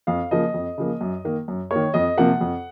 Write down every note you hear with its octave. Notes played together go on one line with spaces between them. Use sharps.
F2 F5
C#3 F3 A#3 D#5
F2
C#3 F3 A#3
F#2
D#3 A#3
F#2
D#3 A#3 C#5
F2 D#5
C3 F3 A#3 F#5
F2